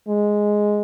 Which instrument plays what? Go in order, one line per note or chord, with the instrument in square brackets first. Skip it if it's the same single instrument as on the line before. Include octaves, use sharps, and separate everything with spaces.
[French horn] G#3